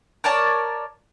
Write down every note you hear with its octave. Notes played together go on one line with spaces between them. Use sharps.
A#4 C#5 D5 A5